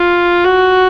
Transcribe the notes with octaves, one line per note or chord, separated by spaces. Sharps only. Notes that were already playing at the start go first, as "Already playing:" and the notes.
Already playing: F4
F#4